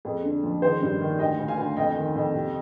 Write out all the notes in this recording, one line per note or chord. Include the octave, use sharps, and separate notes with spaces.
F2 G#4
D3
F3
D#3 G#4 C5
G2
D#3
D2 D#5 G5
D2
F5 G#5
D2
F2 D#5 G5
D#3
F2
C3